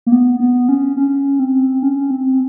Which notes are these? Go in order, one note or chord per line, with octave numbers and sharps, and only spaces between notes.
A#3
B3
B3
C#4
C#4
C4
C#4
C4